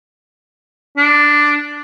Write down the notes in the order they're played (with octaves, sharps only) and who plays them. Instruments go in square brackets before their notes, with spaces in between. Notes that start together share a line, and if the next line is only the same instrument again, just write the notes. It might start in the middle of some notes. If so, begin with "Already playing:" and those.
[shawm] D4